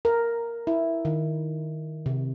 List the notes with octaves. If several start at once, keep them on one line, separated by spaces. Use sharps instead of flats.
A#4
E4
D#3
C3